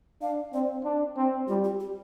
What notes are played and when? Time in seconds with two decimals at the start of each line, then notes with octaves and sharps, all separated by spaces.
0.21 D4 F5
0.53 C4 D5
0.85 D4
1.17 C4
1.48 G3 F4
1.64 G4
1.80 G4